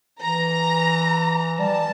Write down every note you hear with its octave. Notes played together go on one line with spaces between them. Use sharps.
E3 A#5
G3 A5